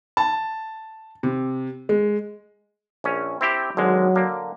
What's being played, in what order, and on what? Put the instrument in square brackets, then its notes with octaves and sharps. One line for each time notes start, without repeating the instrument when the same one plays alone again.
[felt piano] A5
C3
G#3
[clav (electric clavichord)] A#1 C#4
C4 E4 G4
[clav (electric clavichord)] G#1 D3 G#3 [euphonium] F#3
[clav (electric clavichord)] D3 A#3